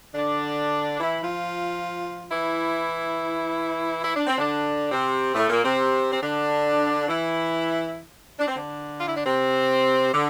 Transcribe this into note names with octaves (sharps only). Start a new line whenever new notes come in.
D3 D4
E3 E4
F3 F4
E3 E4
E4
D4
C4
D3 D4
C3 C4
A2 A3
A#2 A#3
C3 C4
C4
D3 D4
E3 E4
D4
C4
D3 D4
F4
E4
D4
C3 C4
D3